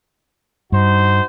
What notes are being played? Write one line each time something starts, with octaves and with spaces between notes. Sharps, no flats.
G2 D#4 F#4 C5